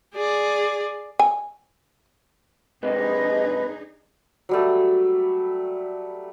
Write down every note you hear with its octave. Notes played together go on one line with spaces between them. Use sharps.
G#4 D5
G#5
G#2 C3 D4 D#4 G#4 B4 D#5
F#3 G3 A3